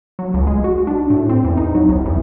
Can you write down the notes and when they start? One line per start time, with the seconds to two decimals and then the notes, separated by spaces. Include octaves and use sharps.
0.19 F#3
0.34 C#2
0.47 G#3
0.64 F#4
0.87 D4
1.10 A2
1.29 C4
1.44 E2
1.57 D#4
1.75 F#3
1.89 C2
2.06 E2